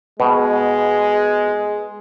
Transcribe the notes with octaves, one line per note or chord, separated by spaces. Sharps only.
B2 G#3